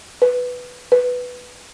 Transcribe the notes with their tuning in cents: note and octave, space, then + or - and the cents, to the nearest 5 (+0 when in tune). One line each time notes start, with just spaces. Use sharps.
B4 +5
B4 +5